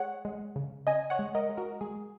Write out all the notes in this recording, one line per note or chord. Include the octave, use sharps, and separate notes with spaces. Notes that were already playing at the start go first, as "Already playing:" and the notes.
Already playing: G#3 C#5 F#5
G#3
C#3
C#3 D#5 G#5
C#5 F#5
G#3
A#4 D#5
G#3
F#4 A#4
G#3 G#4